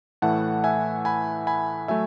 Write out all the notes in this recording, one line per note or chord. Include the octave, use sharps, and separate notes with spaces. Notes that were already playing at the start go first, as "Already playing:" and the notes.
A2 E3 A3 F#5 A5
E5 G#5
G#5 B5
G#5 B5
F#3 A3 E5 G#5